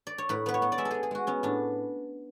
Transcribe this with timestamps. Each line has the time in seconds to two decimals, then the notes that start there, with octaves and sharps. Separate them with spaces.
0.07 D5
0.18 C#5
0.29 A2 B4
0.46 B3 B4
0.54 C#5
0.62 B3
0.72 D5
0.78 G#3 E5
0.85 A4
0.91 G#3 G#4
1.03 G#4
1.11 G#3 F#4
1.27 B3 C#4
1.43 A2 D4